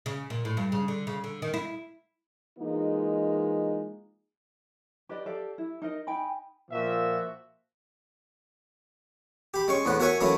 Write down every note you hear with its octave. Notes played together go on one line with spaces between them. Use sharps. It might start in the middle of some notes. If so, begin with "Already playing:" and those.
C#3
A#2
A2
G2
C#3
D3
C#3
D3
D#3
E4
E3 G#3 A#3 D#4 F4
G4 B4 D5 D#5
G4 A4 D5 F5
E4
D#4 A#4 D#5
D#4 G5 G#5 B5
A#2 F3 A#3 F#4 E5
G4 B5
G#3 C#4 C#6
E2 A2 B3 F#5
F#4 A#4 C#5 E5 G#5 C#6
E3 F#3 A3 A#3 C#4 E4